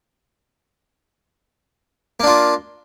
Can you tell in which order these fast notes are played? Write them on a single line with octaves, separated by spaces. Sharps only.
A#3 D4 F4